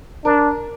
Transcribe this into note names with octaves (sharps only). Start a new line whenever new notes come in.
D4 A#4